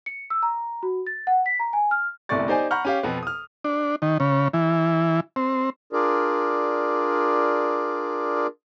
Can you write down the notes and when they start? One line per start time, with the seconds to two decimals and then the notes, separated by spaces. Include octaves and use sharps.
0.06 C#7
0.30 E6
0.43 A#5
0.83 F#4
1.07 A6
1.27 F#5
1.46 B6
1.60 A#5
1.73 G#5
1.91 F6
2.29 G1 C2 A2 D5 C#6 A6
2.48 D#4 G4 C5 D5 G#5
2.71 F#5 A#5 B5 C#6 F6 G6
2.85 C#4 G4 F5
3.03 F2 B2 B3
3.23 D#6 F6
3.64 D4
4.02 D#3
4.20 C#3
4.53 E3
5.36 C4
5.93 D4 F4 G#4 A#4 D5